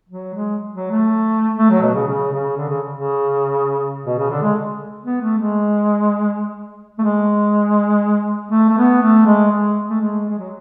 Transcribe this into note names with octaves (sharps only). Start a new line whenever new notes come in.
F#3
G#3
F#3
A3
A3
F#3
B2
C#3
C#3
C#3
D3
C#3
C#3
B2
C#3
D3
G#3
B3
A3
G#3
A3
G#3
A3
A3
B3
A3
G#3
G#3
A3
G#3
G#3
F#3